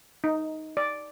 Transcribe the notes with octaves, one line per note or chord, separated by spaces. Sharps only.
D#4
D5